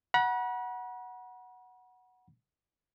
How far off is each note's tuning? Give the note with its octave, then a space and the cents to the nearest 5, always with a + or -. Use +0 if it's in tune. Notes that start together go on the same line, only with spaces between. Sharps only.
F#5 +0 B5 -45